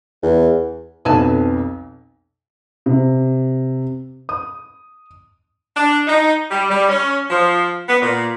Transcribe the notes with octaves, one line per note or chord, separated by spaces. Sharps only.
E2
B1 F2 B4 G#5 A5
C3
D#6
D4
D#4
G3
G3
C#4
F3
B3
A#2